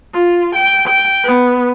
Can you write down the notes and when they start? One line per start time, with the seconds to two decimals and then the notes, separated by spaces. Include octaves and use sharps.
0.14 F4
0.55 G5
0.88 G5
1.24 B3